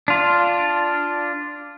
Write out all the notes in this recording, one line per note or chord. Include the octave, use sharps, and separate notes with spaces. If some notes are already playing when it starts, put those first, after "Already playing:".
D4 F4